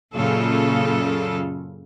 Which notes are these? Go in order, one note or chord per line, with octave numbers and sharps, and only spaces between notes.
F#2 A#2 C#3 F4 A4